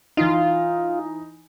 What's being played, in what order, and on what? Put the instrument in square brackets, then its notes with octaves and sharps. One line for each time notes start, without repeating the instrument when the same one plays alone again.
[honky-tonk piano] E3 D#4 [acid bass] F4